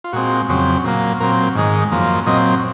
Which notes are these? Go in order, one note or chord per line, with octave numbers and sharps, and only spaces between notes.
F4
A#2 G#3 C4 F#4
F2 C#3 F#3 C4
A#2 F#3 A#3
A#2 F#3 C4 A#4
G#2 D#3 G#3
F#2 F3 A#3
A#2 F#3 C4 D#5